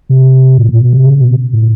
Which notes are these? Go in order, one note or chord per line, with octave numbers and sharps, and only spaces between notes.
C3
A2
A#2
B2
C3
C#3
B2
A2